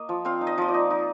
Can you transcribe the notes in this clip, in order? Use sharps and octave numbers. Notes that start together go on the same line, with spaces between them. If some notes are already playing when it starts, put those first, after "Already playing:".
Already playing: A#3 D#5
F3
C4 F5
D#4
D#5
F3 D#5
D5
D#4
D#4